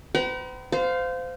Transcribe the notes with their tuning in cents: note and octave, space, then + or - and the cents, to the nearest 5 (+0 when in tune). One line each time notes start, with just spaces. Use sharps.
C5 -45 G5 -45 A#5 +40
C5 -25 F5 +10